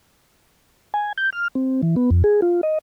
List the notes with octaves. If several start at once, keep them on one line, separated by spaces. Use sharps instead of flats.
G#5
G6
F6
C4
E3
B3
F2
G#4
F4
D#5